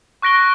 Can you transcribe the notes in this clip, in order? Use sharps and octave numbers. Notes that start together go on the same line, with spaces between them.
C#6 F#6 A#6 D7 G7